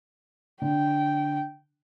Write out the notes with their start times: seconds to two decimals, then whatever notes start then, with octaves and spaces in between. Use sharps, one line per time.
0.62 D3 G5